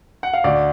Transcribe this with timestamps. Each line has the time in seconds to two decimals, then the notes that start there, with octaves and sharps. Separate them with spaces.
0.23 F#5
0.33 F5
0.44 D2 D5